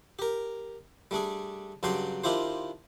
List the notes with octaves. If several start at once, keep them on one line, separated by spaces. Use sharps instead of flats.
G4 A#4
G3 A3 D4 G#4
G2 C#3 F#3 D4 G5 C6
D#3 D4 E4 F4 G4 C5